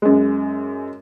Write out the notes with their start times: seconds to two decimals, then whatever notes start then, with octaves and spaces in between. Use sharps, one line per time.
0.02 F#2 G#3